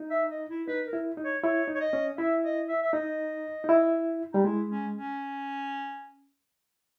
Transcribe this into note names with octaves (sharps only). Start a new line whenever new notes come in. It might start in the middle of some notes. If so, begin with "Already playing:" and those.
Already playing: D#4
E5
D#5
E4
D#4 B4
A#4
E4
D#4
C#5
E4 C#5
D#4
C#5
D#5
C#4
E4 E5
D#5
E5
E5
D#4 D#5
D#4
E4
G3 D#4
G#3 E4
C#4
C#4